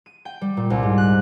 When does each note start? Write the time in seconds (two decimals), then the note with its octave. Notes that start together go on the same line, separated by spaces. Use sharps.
0.06 D#7
0.25 G5
0.41 G3
0.57 A#2
0.70 C2
0.83 G#2
0.98 F#6